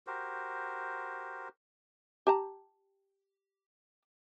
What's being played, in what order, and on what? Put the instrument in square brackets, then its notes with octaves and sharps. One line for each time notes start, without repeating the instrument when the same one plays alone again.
[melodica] F#4 G4 A#4 C5
[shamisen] G4 A5 A#5